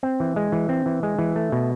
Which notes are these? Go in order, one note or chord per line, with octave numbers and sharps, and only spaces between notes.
C4
E3
G#3
E3
C4
E3
G#3
E3
A3
B2